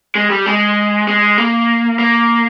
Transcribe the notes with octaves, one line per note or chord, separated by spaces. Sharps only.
G#3
G3
G#3
G#3
A#3
A#3